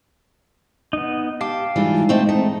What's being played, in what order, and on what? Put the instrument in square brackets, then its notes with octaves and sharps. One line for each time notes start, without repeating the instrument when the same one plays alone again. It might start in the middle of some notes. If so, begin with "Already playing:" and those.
[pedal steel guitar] B3 D#4
[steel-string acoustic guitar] G4 [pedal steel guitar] F5 A5 D6
[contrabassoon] G#2 [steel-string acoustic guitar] E3 G3 F4
[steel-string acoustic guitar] A3 C4 D#5
[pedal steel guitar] A3 [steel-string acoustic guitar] D#4